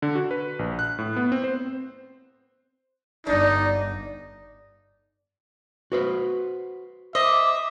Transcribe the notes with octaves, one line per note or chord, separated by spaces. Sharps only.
D3
F#4
B4
A#1
F#6
A2
B3
C4
C5
G1 D4 D#4 D5
F#4 B4 C5
C5 D#5 E5 D6